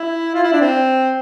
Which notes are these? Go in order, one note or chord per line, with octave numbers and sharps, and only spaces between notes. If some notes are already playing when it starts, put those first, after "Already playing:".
Already playing: E4
F4
E4
D4
C4